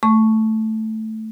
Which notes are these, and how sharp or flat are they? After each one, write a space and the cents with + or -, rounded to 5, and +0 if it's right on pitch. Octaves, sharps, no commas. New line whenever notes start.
A3 +0 C#6 +0